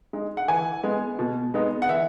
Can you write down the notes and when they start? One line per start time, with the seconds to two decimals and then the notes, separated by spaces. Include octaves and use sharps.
0.13 G#3 D#4
0.37 F#5
0.48 E3 G#5
0.83 G#3 B3
1.19 B2
1.54 G#3 B3 D#4
1.82 F#5
1.89 E3 E5